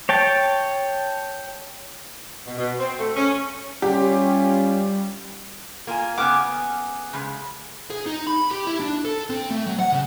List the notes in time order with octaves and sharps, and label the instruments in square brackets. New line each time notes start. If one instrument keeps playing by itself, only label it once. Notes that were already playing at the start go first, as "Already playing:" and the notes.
[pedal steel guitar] C#5 G5 A5
[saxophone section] B2
B2
C4
A3
C#4
[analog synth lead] G3 [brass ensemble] C#4 F4 [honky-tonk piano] G4
[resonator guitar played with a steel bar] A#3 [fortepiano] F4 G#5
[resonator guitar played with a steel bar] C#3 B3 [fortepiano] F#5 F6 [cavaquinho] G#5 D6
[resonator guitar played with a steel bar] C#3 G#3
[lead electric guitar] G#4
D#4
B5
G4
E4
D4
A4
C4
A3
F#3
F#5
C#3